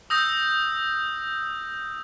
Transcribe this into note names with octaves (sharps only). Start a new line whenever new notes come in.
D#6 E6 G6 A#6